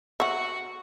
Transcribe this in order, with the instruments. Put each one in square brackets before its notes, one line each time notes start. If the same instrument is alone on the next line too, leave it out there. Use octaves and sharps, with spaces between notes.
[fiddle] F#4 [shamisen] E5 F#5 [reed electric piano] C#6